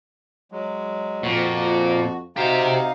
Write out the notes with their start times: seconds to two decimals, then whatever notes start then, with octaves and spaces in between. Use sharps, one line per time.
0.52 F#3 G#3
1.23 F2 A#2 F#4
2.36 C3 D#4 F#4 G4 C5 F5